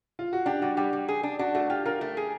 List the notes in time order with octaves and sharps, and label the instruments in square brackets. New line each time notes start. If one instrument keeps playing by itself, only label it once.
[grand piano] F4
F#4
[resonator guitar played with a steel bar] D4 [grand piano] G4
[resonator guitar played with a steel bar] G3 [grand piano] F#4
[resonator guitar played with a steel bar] G3 [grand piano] G4
[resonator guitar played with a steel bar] G3
G#4
D4
[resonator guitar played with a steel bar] D4 [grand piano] F#4
[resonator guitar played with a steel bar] A3 [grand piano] F#4
[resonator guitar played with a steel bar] F4 [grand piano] G4
[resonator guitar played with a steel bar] F4 [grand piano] A#4
[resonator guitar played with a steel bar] A3
G#4